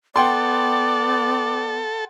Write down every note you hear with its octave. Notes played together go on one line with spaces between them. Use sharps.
B3 A4 D5 F#5 G5 C6